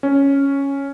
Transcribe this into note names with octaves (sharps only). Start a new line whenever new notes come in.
C#4